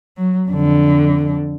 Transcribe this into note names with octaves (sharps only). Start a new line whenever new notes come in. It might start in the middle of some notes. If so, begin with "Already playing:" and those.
F#3
F2 D3